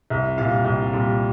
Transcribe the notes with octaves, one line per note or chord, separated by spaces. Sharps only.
C2 E5
A#2 G3 F5
C2
A#2 G3